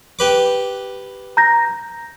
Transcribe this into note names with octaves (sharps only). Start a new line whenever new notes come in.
G4 B4 D6
A#5 G6 A#6